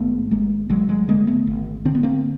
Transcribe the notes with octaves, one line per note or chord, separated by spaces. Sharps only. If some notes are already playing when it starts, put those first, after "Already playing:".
Already playing: G#1 G2 A3 B3
G#1 G#3 A#3
G#1 F#3 G#3
F#3 G#3
D3 G#3 A#3
A3 B3
G#1
D3 C4
B3
A#3 C4